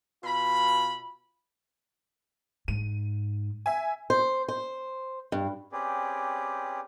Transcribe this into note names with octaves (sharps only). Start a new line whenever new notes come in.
B2 F4 B5
G#2 D#7
E5 G#5
C5
C5
G2
C4 C#4 G4 G#4 B4 D5